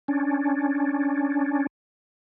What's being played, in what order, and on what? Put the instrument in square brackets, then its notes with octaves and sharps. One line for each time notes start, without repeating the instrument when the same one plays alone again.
[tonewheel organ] C#4 D4